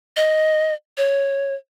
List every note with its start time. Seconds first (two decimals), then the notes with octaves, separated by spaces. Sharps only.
0.17 D#5
0.98 C#5